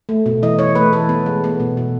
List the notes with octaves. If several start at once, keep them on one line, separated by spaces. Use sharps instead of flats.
A3
B2
E3 D#5
E3 C#5
A3 B4
E3 A4
B3
G#3
B3
B2
B2